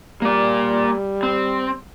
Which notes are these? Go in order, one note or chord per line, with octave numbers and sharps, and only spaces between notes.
G3 A#3 D5
C4